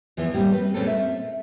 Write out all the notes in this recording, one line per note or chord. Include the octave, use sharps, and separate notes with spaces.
E2 E3 F3 B3
A2 G3 A#3 C4 G4
B4
A#2 A3 C4 C#4 F4 A4
E5